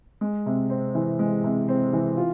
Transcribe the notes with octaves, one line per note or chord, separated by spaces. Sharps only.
G#3
C3
C4
E3
G#3
C3
C4
E3
F4